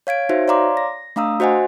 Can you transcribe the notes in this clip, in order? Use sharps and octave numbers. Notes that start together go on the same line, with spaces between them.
C#5 F5 G#6 D7
D#4 F#4 C5 E5
C#5 D5 F5 A#5 C6 D6
A#6
A3 D4 F5 A#5 D#6 E6
F#4 C5 D#5 F#5 G#5